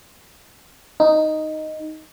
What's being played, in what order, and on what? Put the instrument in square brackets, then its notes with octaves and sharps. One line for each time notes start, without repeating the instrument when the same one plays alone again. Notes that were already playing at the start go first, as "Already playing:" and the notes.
[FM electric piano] D#4